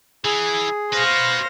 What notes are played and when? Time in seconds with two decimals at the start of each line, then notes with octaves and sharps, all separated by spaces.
0.25 E3 G#4
0.93 F#4 B4 C5 F5 A#6